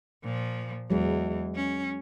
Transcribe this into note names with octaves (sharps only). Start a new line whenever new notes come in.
A#2 F3
E2 F#3 G#3
C#4